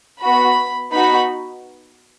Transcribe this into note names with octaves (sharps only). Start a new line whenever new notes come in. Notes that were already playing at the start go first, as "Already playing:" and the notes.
B3 F#4 B5
B3 D#4 F#4 B5